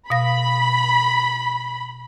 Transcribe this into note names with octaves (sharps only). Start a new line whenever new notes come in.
B2 F5 B5 A#6